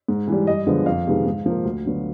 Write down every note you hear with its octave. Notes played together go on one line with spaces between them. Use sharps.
G#2
E3 G3
G2 D#5
D3 F3 G#3 B3
F2 F5
C3 D#3 G#3 B3
G#2
F3 A#3
D2
D3 F#3 B3